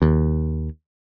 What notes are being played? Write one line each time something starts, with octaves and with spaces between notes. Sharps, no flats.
D#2